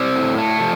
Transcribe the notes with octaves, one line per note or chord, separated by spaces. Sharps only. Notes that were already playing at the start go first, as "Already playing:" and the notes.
Already playing: C4 D5
A2
A3
F3